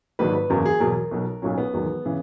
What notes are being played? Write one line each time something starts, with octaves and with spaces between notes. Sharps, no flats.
A#1 G#2 D#3 F#3 B4
B4
F#1 E2 C#3 F#3 A#4
G#4
E2 B2 F#3 A#4
B1 B2 F#3
B1 A#2 F#3 C#4
B3
E1 E2 D#3 F#3
C#3 E3